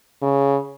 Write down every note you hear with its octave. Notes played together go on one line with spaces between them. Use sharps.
C#3